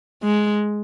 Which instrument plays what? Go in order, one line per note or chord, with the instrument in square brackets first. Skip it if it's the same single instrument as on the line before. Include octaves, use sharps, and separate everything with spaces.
[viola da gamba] G#3